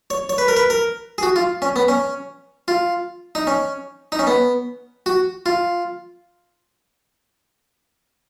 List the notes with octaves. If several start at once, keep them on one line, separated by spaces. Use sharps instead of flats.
C#5
C#5
B4
A#4
B4
A#4
G#4
F#4
F4
C#4
B3
C#4
F4
D#4
C#4
D#4
C#4
B3
F#4
F4